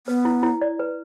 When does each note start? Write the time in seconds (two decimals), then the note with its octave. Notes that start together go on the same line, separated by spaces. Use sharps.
0.07 B3 B4
0.25 E4
0.43 E4
0.61 D5
0.79 B4